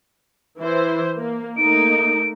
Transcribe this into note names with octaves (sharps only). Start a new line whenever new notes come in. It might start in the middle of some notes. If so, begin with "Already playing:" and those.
E3 E4 C5
A#3
A3 A#3 D#4 D7